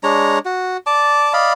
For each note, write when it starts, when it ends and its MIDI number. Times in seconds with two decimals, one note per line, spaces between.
0.03 0.39 56
0.03 0.39 62
0.03 0.39 73
0.03 0.39 82
0.45 0.77 66
0.87 1.33 74
0.87 1.33 81
0.87 1.33 86
1.33 1.53 74
1.33 1.53 75
1.33 1.53 77
1.33 1.53 83